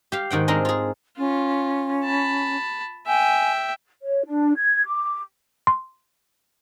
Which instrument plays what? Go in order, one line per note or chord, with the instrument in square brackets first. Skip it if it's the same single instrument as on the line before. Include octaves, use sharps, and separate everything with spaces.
[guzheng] G4 F5
G#2 D#3 F#5 G5
G#3 C4 D4 D#4 A#4
F4 G#4
[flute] C#4 [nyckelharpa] F4
[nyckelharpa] A5 B5
[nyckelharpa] E5 G5 [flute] G#5
[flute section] C#5
D4
G#6
D6
[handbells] C6